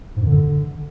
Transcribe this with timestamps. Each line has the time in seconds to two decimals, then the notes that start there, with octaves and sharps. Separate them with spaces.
0.16 G#2
0.21 F#2
0.27 D3